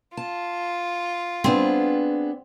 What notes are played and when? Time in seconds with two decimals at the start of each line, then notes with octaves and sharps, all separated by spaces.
0.17 F4 A5
1.44 B3 C4 D4 G#4